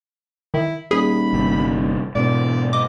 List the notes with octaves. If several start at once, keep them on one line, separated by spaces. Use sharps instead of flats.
D#3 E4
D#1 G#4 B5
G1 C3
E1 G#2 B2 D5
D#5 D6